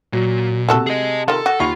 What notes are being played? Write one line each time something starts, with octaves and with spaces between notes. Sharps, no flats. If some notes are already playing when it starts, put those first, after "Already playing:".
A#2 F#3
C3 A3 F#4 A4 A5
G#4 D#5
D#3 F4 A4
F#4
D#2 F4 B5 C#6